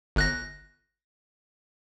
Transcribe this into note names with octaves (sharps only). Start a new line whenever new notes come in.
G1 F#6 A#6